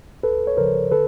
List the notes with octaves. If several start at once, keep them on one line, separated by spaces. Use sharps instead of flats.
D2 A4 B4
C#5
C#3 F3 A#4 C5
D3 A4 B4